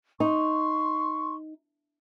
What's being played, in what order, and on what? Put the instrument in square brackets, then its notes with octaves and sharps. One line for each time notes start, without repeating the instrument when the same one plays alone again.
[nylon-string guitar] D#4 [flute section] C6 C#6